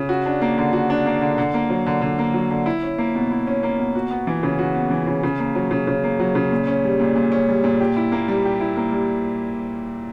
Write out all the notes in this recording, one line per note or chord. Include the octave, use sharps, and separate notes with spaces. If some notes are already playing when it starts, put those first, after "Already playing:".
Already playing: C#3
F#4
D4
A#3
D3
F#4
D4
A#3
D3
D3
A#3
F#3
D3
D3
A#3
F#3
D3
E4
C#4
A#3
B2
E4
C#4
A#3
B2
F#4
B3
E3
C#3
F#4
B3
E3
C#3
C#3
A#3
F#3
C#3
C#3
A#3
F#3
C#3
A#2
C#4
G3
A#2
A#2
C#4
G3
A#2
G4
E4
A#3
G3
G4
E4
A#3
G3